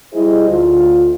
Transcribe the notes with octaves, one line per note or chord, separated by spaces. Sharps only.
G3 E4 G#4 C5 D#5
D2 F4